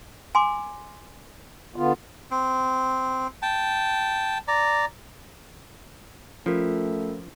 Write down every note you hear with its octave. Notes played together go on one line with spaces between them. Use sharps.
G#5 C6 D6
D3 B3 F4
C4
G5 A5
D5 A#5
F3 A3 C#4 F4 A#4